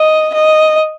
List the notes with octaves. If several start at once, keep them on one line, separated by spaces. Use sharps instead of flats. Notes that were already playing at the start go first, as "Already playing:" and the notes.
Already playing: D#5
D#5